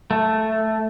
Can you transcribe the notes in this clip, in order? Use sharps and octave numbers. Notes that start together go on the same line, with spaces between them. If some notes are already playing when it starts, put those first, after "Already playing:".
A3